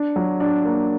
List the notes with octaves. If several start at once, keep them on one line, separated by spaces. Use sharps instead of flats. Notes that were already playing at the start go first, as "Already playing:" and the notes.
Already playing: D4
F#3
D4
A#3